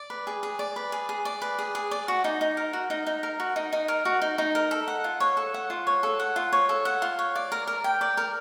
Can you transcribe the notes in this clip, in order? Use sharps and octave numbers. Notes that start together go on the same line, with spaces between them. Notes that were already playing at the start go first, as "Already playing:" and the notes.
Already playing: D5
B4
G#4
G#4
D5
B4
G#4
G#4
D5
B4
G#4
G#4
D5
F#4
D#4
D#4
A#4
F#4
D#4
D#4
A#4
F#4
D#4
D#4
A#4
F#4
D#4
D#4
A#4
A4
F#5
F4
C#5
A4
F#5
F4
C#5
A4
F#5
F4
C#5
A4
F#5
F4
C#5
D5
A#4
A#4
G5
D5
A#4